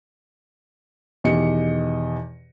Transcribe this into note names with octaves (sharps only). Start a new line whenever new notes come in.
E2 B2 D#3 G4 D#5 C#7